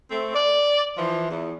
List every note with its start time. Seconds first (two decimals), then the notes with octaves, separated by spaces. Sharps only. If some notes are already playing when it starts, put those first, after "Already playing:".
0.11 A3 C4
0.34 D5
0.98 E3 F3
1.30 E2